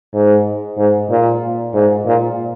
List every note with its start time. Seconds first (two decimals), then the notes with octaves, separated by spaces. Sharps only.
0.14 G#2
0.78 G#2
1.10 A#2
1.74 G#2
2.06 A#2